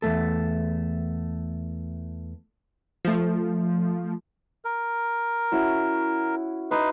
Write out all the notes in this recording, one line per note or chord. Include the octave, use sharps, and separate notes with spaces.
E2 B2 A3 A4
F3 A3
A#4
C#4 E4 F#4
D#4 B4 C6